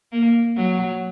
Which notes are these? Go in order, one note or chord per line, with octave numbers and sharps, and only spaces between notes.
A#3
F#3